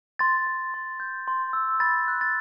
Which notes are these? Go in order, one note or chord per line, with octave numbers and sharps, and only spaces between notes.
C6 A6
C6
C6
G6
C6
E6
B5 A6
F#6
A6